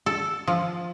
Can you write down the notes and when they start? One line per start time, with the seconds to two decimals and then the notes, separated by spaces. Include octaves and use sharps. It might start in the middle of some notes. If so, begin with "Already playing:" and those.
0.06 A4
0.47 F3